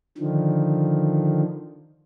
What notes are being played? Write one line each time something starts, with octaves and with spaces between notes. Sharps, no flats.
D3 D#3 F3